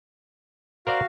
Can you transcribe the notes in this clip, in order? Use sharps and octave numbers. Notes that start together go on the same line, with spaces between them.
F#4 A#4 C5 D5 F5